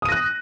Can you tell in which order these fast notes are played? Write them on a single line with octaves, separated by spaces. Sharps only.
D#6 D#7 A#6 F#6